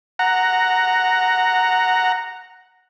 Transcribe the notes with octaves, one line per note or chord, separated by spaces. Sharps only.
F#5 A#5